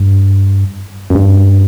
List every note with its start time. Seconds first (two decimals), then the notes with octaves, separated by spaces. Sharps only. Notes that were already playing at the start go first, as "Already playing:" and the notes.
Already playing: G2
1.10 F#2
1.15 G2